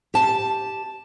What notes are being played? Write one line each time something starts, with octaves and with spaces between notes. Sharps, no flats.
G4 A5